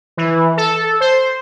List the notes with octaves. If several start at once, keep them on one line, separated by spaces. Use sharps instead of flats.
E3
A4
C5